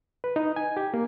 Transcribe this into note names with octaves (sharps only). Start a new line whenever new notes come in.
B4
D#4
G#5
G4
A#3